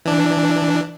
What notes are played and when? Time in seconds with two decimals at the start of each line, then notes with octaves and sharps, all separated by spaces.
0.05 E3 D4